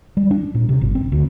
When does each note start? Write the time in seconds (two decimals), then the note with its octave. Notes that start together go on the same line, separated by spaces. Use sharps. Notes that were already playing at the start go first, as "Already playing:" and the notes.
0.17 G3
0.31 D4
0.55 A#2
0.69 C3
0.81 G1
0.95 C4
1.12 D2